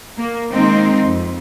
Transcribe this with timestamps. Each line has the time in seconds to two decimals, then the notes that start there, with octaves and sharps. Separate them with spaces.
0.18 A#3
0.51 D#3 G#3 A#3 C4 D#4 C5
1.03 F2